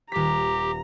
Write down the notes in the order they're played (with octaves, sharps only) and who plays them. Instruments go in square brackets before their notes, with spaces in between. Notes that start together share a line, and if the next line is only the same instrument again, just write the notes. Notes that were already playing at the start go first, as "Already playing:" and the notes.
[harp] D#1 B6 [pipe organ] G4 [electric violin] A#5